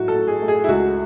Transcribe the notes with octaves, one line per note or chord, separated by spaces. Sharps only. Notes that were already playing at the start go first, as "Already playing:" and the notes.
Already playing: A1 A2 F#3 E4 F#4
A4
A2
G#4
A3
G#4
E4
C#2 F#4